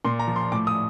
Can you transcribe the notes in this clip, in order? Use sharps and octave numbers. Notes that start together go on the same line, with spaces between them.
A#2 C6
A#5
F3
C6
A2 D6
D#6